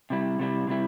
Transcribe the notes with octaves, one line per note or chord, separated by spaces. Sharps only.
C3 G3 E4
C3 G3 E4
C3 G3 E4